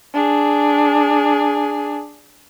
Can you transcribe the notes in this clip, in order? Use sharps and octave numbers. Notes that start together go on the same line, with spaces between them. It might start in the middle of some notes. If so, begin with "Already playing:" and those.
D4 G#4